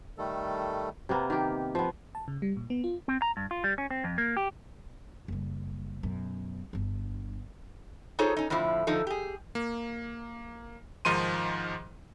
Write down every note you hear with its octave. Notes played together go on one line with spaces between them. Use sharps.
D#3 G3 A3 A4
C3 A#3 B3
D#3 G4
F3 B3
A5
C#3
G3
A#2
B3
F4
C4
A#5
G2
F4
G3
C#4
C4
F2
A#3
G4
F#1 G3
F#2 B2
G1 D4
D#4 F4 G#4 A4 C5 C#5
C#4 D#4
F2 A2 D3 F3 E4
D3 F3 D#4 A4
G4 G#4
A#3
G#2 D#3 F3 C6 D#7